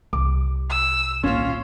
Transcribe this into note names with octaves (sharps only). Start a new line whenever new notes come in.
C2 D6
E6
G#1 A#2 C#4 F4